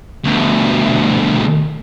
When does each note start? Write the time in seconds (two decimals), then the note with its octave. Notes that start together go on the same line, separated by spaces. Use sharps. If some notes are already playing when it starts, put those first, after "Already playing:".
0.24 D2 B2